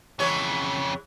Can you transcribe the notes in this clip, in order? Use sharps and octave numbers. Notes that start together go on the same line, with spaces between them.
F2 C#3 E3 G#3 C#5